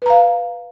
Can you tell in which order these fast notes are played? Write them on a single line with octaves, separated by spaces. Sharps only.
B4 A#5 F5